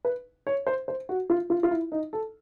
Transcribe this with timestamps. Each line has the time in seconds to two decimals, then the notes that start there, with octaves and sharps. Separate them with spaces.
0.05 B4
0.47 C#5
0.67 C5
0.88 C5
1.09 F#4
1.30 F4
1.50 F4
1.63 F4
1.71 E4
1.92 D#4
2.13 A4